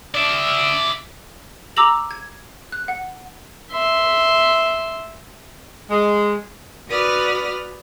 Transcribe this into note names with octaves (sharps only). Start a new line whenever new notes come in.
D5 E5
A#5 D6 E6 A#6 F7 F#7
G#6
F#6
F#5
E5 C6
G#3
F#4 B4 D5 D#6 F6